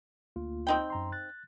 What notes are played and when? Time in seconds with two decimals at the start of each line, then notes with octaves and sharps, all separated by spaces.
0.36 D2 A#3 F4
0.67 C4 D#4 G5
0.90 F#2 A#5 C6
1.12 F#6 A6